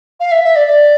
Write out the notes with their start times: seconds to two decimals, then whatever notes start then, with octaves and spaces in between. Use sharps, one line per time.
0.20 F5
0.32 E5
0.44 E5
0.56 D5
0.67 D5